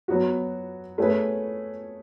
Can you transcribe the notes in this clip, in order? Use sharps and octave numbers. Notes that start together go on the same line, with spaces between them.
F#3 B3 F#4
A3 C#4 G#4 B4